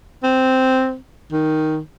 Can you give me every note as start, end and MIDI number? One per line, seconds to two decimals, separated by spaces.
0.23 0.96 60
1.32 1.79 51